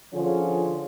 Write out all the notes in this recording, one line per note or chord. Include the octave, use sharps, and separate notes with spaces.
D3 F3 C#4 F4 G#4 C#5